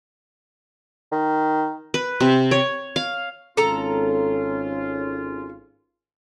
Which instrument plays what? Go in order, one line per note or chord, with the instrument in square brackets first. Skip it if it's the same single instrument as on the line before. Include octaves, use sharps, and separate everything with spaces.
[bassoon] D#3
[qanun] B4
C3
C#5
F5
[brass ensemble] G#1 C#4 F4 [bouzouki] A4 A#5